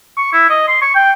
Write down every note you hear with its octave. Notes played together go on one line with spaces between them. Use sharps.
C#6
E4
D#5
C6
C#6
G5